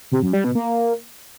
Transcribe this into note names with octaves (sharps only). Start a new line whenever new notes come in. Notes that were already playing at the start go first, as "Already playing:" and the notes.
C3
F#2
G3
B2
A#3